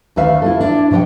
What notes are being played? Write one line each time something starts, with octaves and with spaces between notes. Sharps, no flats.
D2 D#3 A3 B4 E5 F5
E4 F4 A4
D4 E4
B2 F3 C#5 F#5 G5